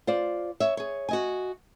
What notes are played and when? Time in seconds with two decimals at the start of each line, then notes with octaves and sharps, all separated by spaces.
0.07 F4 C5 D5
0.60 C#5 E5
0.77 G#4 C#5
1.09 F#4 D#5 G#5